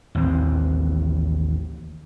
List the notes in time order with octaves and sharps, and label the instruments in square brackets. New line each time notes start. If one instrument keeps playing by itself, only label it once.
[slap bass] A1 D#2 E3 C4